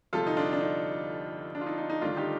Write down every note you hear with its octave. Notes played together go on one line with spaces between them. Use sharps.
G1 F2 C3 G3 F4 A4
D#4
D4 F4
D4
D#4
D4
F4
D#4
D#4
D#4
G1 G2 D#3 A3 D4 F4
D#4 G4